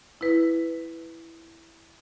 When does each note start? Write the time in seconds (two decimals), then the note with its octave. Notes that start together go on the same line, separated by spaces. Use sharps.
0.21 E4 B4